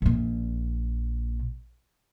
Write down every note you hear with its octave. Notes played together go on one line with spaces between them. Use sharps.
A#1 A#2